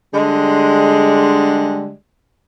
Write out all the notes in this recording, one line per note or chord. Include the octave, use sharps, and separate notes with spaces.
D3 G3 G#3